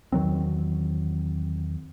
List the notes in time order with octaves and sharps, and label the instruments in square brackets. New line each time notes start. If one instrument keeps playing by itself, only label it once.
[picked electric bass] E2 D#3 F#3 C4